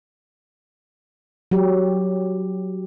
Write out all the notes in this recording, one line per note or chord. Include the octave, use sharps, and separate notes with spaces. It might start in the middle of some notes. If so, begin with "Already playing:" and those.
F#3 G4